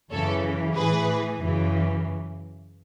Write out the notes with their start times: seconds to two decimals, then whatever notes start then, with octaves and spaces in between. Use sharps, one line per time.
0.11 F#2 C#3 E3 A4 C#5
0.75 A2 E3 G#4 B4
1.41 F#2 C#3 E3